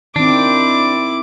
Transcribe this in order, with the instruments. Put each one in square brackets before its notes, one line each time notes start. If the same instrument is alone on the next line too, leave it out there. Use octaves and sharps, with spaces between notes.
[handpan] D#3 C4 [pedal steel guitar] D4 [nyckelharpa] E4 D6